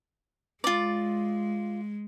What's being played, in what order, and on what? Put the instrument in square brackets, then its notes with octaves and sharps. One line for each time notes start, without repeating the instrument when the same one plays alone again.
[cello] G#3 [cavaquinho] F4 D5